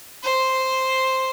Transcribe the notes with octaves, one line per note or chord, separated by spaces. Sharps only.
C5